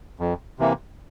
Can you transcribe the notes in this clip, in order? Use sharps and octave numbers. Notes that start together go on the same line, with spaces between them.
F2
C3 E3 A#3